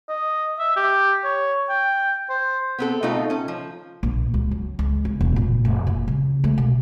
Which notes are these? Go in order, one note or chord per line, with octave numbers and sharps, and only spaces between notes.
D#5
E5
G4
C#5
G5
C5
B3 C4 A4
B2 A3 C4 D#4 F4 A4
C#4 A4
F3
A#1
C#2
F#3
C#2
C#4
E1
A#2
F1
A#2
C#3
A3
B2